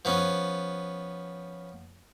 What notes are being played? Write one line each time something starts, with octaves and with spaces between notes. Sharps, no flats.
F3 B3 C#4